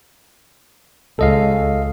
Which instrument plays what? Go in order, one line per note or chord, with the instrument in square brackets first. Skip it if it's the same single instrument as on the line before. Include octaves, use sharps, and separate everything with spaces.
[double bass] C#2 [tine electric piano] A4 D#5 F5